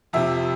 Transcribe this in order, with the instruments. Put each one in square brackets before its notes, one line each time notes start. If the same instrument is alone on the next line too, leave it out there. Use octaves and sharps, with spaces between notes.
[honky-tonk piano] F2 C3 F3 E5